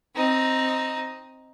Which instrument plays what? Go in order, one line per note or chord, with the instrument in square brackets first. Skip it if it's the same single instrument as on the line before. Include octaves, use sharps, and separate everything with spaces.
[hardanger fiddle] C4 D#4